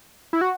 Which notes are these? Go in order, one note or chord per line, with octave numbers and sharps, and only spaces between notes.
E4
F#4